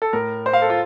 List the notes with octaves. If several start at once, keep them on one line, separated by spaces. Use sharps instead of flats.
A4
A2 A#4
C5
F5
A4
F4